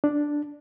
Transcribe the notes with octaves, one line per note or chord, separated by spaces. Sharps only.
D4